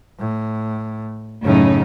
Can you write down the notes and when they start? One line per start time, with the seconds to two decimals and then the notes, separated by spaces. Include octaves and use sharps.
0.19 A2
1.44 F#2 A2 C#3 D#4